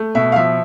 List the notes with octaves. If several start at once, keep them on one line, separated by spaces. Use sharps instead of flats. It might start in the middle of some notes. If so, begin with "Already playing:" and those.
Already playing: A3
B2 E5
F5
F3 E5